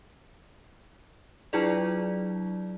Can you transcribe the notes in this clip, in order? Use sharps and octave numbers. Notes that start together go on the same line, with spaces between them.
F#3 D4 E4 F4 G#4 D5